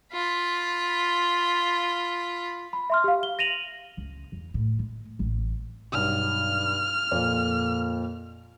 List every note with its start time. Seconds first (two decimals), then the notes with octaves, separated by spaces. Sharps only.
0.12 F4 B5
2.73 B5
2.90 E5 C6 F6
3.04 G4 F5
3.23 G7
3.39 A#6 D#7 F7 F#7
3.97 C#2
4.32 E2
4.54 A2
4.79 G#3
5.19 A1
5.93 B1 G2 F6
7.11 F2 A#2